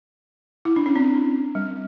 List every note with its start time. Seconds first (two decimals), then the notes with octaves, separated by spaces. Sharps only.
0.65 E4
0.76 D4
0.86 C#4
0.96 C4
1.55 G3